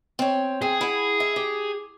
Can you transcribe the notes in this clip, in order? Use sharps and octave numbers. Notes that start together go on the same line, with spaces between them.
C4 C#5
C4 G#4
E4 F#5
E5
G4